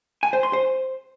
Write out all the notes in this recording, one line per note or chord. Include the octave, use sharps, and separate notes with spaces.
G#5
C5
C6
C5